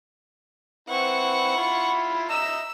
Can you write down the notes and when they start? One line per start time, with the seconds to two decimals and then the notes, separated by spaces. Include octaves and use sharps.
0.89 C4 E4 B4 F#5 C#6
1.57 E4 F4 B5
2.29 D#5 E5 A#5 E6